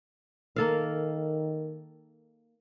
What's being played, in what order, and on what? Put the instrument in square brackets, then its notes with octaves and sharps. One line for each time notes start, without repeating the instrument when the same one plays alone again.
[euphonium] D#3 [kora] A#3 A4 F5